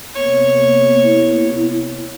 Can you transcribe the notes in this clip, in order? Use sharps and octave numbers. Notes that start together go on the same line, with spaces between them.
C3 A#3 B3 C#5
E4